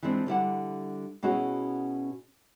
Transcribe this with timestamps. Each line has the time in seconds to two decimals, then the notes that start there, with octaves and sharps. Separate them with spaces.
0.02 E3 F3 G#3 C4 D4
0.26 D3 G3 E4 F#5
1.23 B2 C#4 E4 F#4 G#4